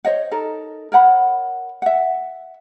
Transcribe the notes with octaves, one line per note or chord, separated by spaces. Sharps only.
C5 C#5 D#5 F#5
D#4 A4 A#4
A#4 C#5 F#5 B5
E5 F#5